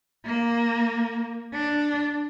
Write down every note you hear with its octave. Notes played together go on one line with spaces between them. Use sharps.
A#3
D4